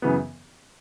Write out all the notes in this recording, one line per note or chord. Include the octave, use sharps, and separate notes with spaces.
F#2 C#3 E3 B3